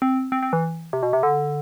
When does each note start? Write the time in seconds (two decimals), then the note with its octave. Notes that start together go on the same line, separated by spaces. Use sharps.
0.02 C4
0.32 C4
0.43 C4
0.53 E3
0.93 C3
1.03 B2
1.13 C3
1.23 D3